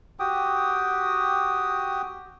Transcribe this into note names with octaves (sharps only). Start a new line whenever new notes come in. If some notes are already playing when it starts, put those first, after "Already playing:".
F#4 G4 G5 D#6